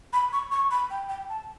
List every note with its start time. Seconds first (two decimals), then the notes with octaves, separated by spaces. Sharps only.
0.13 B5
0.33 C#6
0.52 C#6
0.71 B5
0.90 G5
1.09 G5
1.29 A5